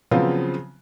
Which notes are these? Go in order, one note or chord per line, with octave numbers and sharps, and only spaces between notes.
C#3 F3 F#3 B3 C4 F4